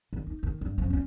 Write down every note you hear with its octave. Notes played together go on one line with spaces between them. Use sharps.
D#3
D#4
D#3
G2
F#2 F3
C#4 F4